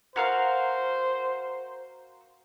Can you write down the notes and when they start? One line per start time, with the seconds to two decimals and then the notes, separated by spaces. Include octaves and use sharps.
0.16 F#4 A#4 C5 F5